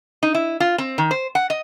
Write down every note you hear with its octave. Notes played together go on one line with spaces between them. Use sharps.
D#4
E4
F4
C4
D#3
C5
F#5
D#5